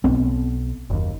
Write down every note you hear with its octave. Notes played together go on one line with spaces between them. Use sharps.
B1 B3 C4
F#1 D#2